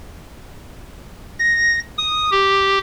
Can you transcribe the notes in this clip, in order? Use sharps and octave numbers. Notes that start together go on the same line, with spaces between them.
A#6
D#6
G4